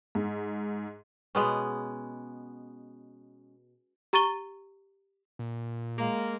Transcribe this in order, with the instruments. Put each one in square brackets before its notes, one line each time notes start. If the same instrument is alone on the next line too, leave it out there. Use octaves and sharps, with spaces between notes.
[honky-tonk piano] G#2
[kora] B2 G#3 B3 C#4
[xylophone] G4 A#5 C#6 A6 D#7 G7
[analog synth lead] A#2
[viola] G#3 [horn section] A#3